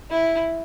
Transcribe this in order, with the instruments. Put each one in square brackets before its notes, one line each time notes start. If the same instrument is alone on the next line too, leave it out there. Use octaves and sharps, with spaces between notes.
[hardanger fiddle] E4